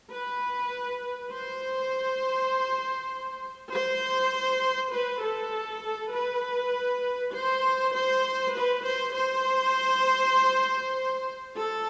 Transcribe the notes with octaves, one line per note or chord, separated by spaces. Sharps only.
B4
C5
C5
B4
A4
B4
C5
C5
B4
C5
C5
A4